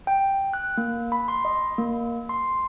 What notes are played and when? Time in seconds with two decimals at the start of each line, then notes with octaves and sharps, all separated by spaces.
0.07 G5
0.53 F#6
0.77 A#3
1.12 B5
1.28 C6
1.45 D#5
1.78 A#3
2.29 C6